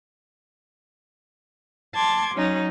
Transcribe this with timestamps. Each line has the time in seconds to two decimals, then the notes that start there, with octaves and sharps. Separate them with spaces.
1.94 A5 C6 D6 G#6
2.34 F#3 C#4 D#4